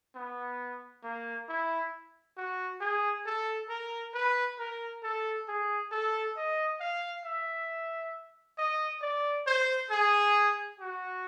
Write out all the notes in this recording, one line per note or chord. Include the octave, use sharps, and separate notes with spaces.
B3
A#3
E4
F#4
G#4
A4
A#4
B4
A#4
A4
G#4
A4
D#5
F5
E5
D#5
D5
C5
G#4
F#4